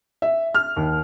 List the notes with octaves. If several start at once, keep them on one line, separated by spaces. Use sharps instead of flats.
E5
F6
D#2